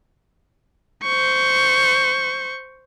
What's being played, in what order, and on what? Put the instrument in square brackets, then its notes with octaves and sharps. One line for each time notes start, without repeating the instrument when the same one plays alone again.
[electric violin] C5 C#6